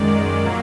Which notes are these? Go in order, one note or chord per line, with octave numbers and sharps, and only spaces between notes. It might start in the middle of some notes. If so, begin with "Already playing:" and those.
Already playing: F#2 D#3 G#3 D5
A#2 F#3 A#3